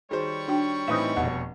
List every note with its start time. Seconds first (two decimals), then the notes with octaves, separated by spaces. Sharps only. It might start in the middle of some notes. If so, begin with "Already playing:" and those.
0.11 D#3 G3 F#4 G#4 C5 C#5 C#6
0.48 D4 F#4 G5
0.88 A2 E3 C4 D#4 B4 E5
1.16 F1 B2 F#5